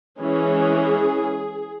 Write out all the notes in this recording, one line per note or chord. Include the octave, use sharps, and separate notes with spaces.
E3 G#3 C#4 G#4